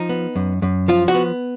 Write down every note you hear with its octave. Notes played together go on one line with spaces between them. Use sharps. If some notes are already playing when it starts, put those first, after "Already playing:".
Already playing: F3 D#4
B3
F#2
F#2
F3 F4
F#4
B3